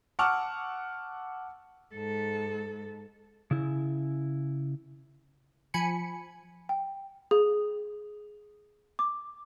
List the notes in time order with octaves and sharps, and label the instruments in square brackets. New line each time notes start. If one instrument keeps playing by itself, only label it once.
[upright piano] F#5 A5 C#6 D6 E6 F6
[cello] G#2 A4
[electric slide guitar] C#3 E4
[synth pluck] F3 G#5 B5 C#7
[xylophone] G5
G#4
D6